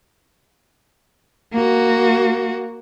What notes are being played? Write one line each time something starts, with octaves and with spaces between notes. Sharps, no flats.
A#3 F#4